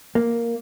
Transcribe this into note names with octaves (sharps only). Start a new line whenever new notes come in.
A#3